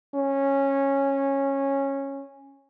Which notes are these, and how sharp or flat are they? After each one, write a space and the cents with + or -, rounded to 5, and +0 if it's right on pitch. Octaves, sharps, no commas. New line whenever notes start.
C#4 -10